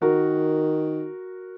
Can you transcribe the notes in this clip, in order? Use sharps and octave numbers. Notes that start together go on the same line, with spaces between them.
D#3 F#4 A#4